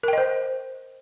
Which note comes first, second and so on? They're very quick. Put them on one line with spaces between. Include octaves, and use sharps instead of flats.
A#4 G5 D#5 C5